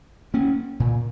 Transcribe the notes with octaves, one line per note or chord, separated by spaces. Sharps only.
A#3 C#4
A#2